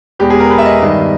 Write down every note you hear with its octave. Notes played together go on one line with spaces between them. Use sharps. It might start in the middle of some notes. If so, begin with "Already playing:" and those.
E2 B2 G#3 B3 G4
G#4
A#4
B4
E5
D#5
G2 D#3 G3 B3